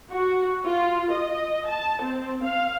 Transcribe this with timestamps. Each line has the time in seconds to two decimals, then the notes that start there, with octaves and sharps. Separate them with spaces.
0.11 F#4
0.65 F4
1.12 D#5
1.67 A5
2.02 C4
2.43 F5